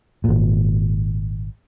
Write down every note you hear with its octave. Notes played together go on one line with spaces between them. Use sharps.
G#1 A#2